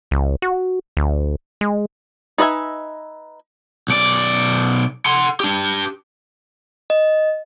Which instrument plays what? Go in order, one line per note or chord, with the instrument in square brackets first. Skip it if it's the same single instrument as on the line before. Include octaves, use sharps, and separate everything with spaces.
[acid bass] C#2
F#4
D2
G#3
[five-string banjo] D#4 B4 D5 E5 G#5
[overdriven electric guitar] B1 D5
F#5 C6
D4 G4
[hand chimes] D#5